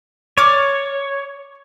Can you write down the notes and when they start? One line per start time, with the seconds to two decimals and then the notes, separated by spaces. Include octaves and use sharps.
0.38 C#5 D5 D6 F6